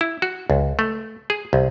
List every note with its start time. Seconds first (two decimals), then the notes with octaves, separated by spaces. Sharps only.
0.01 E4
0.22 F#4
0.50 C#2
0.79 A3
1.30 G#4
1.53 C2